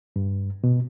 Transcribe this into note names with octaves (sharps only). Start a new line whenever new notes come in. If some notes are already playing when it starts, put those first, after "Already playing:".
G2
B2